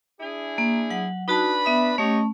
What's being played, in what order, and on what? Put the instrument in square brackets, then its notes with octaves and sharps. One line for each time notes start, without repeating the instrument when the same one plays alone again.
[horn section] D4 E4 G#4
[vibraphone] A#3
F#3 F#5
[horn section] D4 B4 B5 [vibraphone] D#4 F#4 A5
[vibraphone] B3 E5 D#6
[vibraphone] A3 C#4 [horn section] G4 C#5 D#5